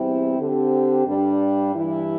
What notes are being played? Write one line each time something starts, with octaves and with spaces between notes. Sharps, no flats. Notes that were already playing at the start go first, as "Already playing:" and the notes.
Already playing: E2 C3 G3 C4 E4
D3 C4 G4
G2 G3 D4
G2 E3 G3 E4